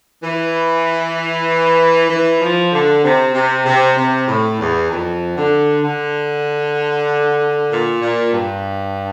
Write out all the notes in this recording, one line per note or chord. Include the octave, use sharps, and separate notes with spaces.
E3
E3
F3
D3
C3
C3
C3
C3
A2
E2
F2
D3
D3
A#2
A#2
G2